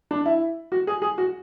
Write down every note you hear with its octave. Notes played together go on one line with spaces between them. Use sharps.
D4
E4
F#4
G#4
G#4
F#4